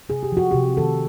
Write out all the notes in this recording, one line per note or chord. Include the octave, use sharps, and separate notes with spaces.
C3 G#4
G4
F3 F#4
C3 G4
D#3 A4